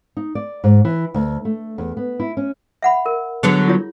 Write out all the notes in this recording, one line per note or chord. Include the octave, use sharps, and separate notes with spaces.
D#4
D5
G#2
E3
D2
A3
E2
B3
E4
C#4
E5 F#5 B5
A#4
D3 F#3 B3 G#4
E4 F4 C#5